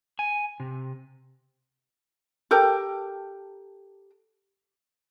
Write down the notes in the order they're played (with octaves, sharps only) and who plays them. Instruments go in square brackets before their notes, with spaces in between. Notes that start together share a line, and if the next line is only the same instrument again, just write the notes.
[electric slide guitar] G#5
C3
[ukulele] G4 A4 A#4 G5